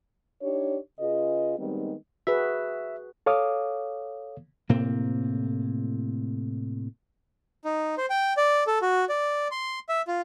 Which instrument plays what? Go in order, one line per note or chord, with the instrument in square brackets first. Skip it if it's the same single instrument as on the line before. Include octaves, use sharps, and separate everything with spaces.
[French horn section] D4 D#4 G4 C#5
C#3 F4 G#4 B4 D#5
D#3 G3 G#3 B3 C4 D#4
[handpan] F#4 G#4 B4 [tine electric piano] E5
[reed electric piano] A4 C#5 F5 D6 D#6
[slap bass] A2 C3 A#3 C4
[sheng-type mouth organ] D#4
C5
G5
D5
A4
F#4
D5
C6
E5
F4